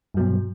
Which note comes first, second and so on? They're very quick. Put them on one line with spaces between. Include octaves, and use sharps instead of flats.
G2 F#3 B2